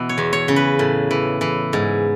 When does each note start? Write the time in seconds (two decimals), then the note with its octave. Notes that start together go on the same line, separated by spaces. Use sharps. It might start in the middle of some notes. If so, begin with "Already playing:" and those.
Already playing: B2 E3
0.09 C#5
0.18 E2
0.33 C#5
0.48 C#3
0.56 B4
0.79 A2
1.11 E3
1.41 E3
1.73 G#2